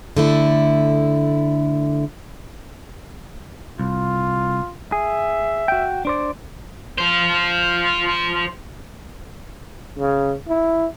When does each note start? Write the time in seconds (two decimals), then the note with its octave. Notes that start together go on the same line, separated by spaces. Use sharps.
0.17 D3 A3 E4
3.80 C2 F4
4.92 G#4 E5
5.68 F#4 G5
6.05 D4 C5 D5
6.98 F4 C5
9.99 C#3
10.49 E4